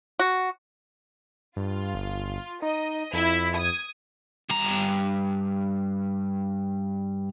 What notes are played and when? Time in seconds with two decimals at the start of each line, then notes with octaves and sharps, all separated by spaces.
0.19 F#4
1.57 G2 F4
1.95 G1
2.62 D#4 D#5
3.13 F2 E4
3.57 D#6 G#6
4.50 G2 A#5